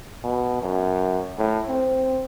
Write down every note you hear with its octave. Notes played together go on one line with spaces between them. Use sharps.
B2
F#2
A2
C4